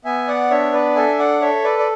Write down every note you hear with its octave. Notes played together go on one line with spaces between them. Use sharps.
B3 E5 G#5
D5 F#5
D4 C#5 E5
B4 D5
A4 E5 G#5
D5 F#5
A4 C#5 E5
B4 D5
D5